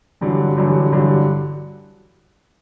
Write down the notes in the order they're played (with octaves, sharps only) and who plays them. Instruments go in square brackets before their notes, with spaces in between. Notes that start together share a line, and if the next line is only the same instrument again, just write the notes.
[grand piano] A1 G2 D3 F#3
A1 G2 D3 F#3
A1 G2 D3 F#3